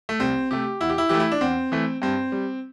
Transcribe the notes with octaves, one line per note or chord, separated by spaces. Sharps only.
A3
C2 C4
C3 A3 G4
E2 E4
G4
E4
E3 A3 G4
E4
D4
E2 C4
E3 A3
G2 C4
G3